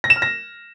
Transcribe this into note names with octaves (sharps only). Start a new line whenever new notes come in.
A#6
E7
F6
A#6